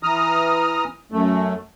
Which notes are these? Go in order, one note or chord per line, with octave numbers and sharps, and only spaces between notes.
E3 A#5 D#6 F6
F#2 A3